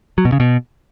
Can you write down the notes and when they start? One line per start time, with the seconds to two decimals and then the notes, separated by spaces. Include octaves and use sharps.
0.18 F#3
0.25 B2
0.32 C#3
0.40 B2